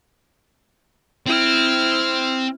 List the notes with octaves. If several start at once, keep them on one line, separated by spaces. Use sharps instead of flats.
C4 E4 F6